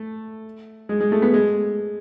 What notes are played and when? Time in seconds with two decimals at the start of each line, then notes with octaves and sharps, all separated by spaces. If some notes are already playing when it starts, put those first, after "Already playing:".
Already playing: A3
0.89 G#3
1.01 G#3
1.12 A3
1.22 B3
1.34 G#3